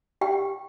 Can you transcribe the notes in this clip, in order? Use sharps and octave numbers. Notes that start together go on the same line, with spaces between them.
G4 G5